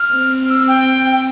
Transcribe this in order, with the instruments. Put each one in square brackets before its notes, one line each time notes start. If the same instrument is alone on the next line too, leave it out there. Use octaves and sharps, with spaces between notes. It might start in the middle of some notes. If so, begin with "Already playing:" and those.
Already playing: [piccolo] F6
[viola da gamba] C4
[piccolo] E6
G5
G5